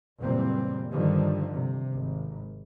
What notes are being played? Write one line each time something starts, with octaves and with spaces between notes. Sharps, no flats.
F#1 A#2 E3 G3 C4
G2 D3 D#3 F3 G3
C3
G#1